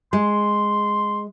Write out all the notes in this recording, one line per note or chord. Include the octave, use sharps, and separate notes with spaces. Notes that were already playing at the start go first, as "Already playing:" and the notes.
G#3 C6